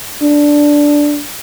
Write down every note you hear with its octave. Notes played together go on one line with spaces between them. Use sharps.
D4